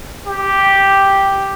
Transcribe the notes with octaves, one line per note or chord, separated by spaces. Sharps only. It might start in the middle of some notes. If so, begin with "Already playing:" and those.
G4